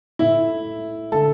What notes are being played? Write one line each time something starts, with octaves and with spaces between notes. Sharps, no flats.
A2 A3 E4 E5
D3 A3 A4 A5